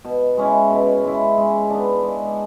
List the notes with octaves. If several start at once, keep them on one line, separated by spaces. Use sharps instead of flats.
B2
G#3 C#4 E4
B2
G#3 C#4 E4
G#3
B3 D4
G#3